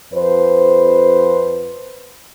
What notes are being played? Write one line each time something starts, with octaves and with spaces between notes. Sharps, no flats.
F2 B4 C5